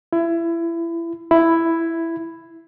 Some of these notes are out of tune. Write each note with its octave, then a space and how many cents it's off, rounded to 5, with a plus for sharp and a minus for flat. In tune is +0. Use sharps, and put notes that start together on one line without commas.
E4 +25
E4 +5